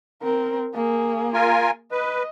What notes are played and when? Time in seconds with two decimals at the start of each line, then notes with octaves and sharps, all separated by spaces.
0.22 C4 A#4
0.75 A#3 G#4
1.34 F4 A#4 G#5
1.92 B4 D#5